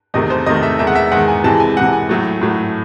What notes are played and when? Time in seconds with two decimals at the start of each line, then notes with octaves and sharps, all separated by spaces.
0.14 E2 C3 D#3 A3 D#5
0.30 C5
0.46 E2 C3 D#3 A3 D#5
0.63 E5
0.79 E2 D#3 G#3 E5
0.87 F#5
0.96 E5
1.11 E2 D#3 G#3 F#5
1.28 G#5
1.44 C3 E3 G#3 A5
1.60 G#5
1.77 C3 E3 G#3 F#5
1.93 G#5
2.09 A2 F#3 A3
2.41 A2 F#3 A3